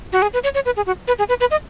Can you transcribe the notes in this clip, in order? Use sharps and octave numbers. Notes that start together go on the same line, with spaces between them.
F#4
G#4
B4
C#5
C#5
B4
G#4
F#4
B4
G#4
B4
B4
D#5